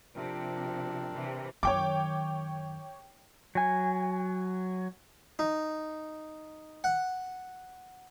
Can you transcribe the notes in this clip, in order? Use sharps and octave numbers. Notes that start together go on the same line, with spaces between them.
C3 F3 C4 D4 A#4
C3 E3
F#2 D#3 C#5 G5 D6
F#3 G#5
D#4
F#5